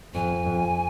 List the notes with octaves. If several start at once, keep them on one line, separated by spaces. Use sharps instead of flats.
F2 G#5
F2